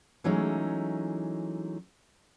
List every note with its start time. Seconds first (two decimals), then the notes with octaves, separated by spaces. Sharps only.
0.24 E3 F#3 G#3 A3 C#4 D#4